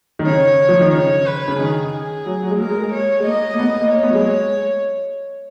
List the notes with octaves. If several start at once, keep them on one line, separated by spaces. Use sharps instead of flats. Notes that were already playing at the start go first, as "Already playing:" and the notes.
D#3
C#3 C#5
F3
D#3
C#3 C#5
B4
C#3
D#3 G#4
G#4
F#3
F#3
G#3
A#3 A#4
G#3
G#3
C#5
G#3
A#3 D#5
A#3
B3
B3
A#3
A#3 C#5
B3
F#3
G#3